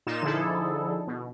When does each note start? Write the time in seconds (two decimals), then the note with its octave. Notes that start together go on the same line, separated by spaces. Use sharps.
0.06 A#2 D#4 F4 E7
0.22 D3 F3 D#4 E4 G#4 A4
1.07 B2